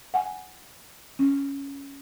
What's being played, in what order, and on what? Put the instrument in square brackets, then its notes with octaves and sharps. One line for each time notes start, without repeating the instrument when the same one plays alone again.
[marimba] F#5 G#5
C#4